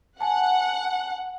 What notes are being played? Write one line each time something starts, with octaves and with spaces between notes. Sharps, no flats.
F#5 G#5 A5